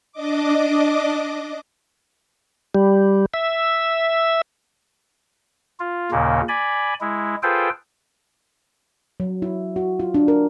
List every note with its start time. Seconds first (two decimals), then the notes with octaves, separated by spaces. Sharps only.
0.12 D4 D#5 D6
2.75 G3
3.34 E5
5.80 F4
6.11 D#2 A#2 C#3 A#3
6.49 D5 G#5 B5
7.01 G#3 E4
7.43 F4 G#4 A4 B4 C5 G5
9.20 F#3
9.42 E4
9.76 F#4
10.00 F4
10.14 D4
10.28 A#4